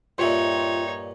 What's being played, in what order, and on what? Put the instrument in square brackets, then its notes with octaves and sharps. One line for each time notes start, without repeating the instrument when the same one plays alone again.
[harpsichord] G2 A#2 [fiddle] D#4 C#5 [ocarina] F4 [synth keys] E5 G5 C6